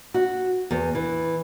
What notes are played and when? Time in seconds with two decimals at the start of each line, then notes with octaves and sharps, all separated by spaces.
0.14 F#4
0.71 E2
0.95 E3